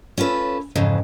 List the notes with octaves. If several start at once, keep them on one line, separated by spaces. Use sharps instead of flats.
C#4 F4 A4 B4
F2 G#2 C#3 E3